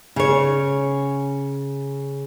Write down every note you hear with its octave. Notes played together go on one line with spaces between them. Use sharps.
C#3 C#5